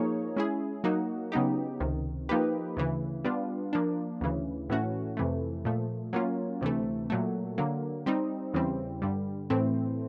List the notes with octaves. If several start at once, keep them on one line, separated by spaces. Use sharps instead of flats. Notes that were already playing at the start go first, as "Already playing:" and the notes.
Already playing: F3 A#3 D#4 G#4 C#5
G#3 C#4 E4 G#4
F#3 A#3 D#4 F#4
C#3 F#3 B3 D#4 G4
C#2 C3 D#3
F3 A#3 D#4 G4 B4
D2 C#3 E3
G3 B3 D4 F4
F3 A#3 D4
D2 C#3 E3
A2 E3 A3 C#4 F#4
F2 C3 E3 A3
A#2 F3 A3
F#3 A#3 C#4 F4
D2 C3 E3 A3
A#2 F#3 A3
D3 F#3 A#3
G3 C4 D#4
E2 C#3 E3 G3 C4
G2 D3 G3
A2 E3 A3 C4